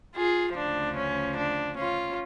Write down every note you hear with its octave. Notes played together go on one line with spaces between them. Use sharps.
F4 G#4
D2 C#3 F3 D4
C#4
D4
C#4 F4